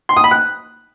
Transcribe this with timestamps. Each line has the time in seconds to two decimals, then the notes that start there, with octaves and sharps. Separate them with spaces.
0.09 C6
0.17 D#6
0.24 B5
0.31 F#6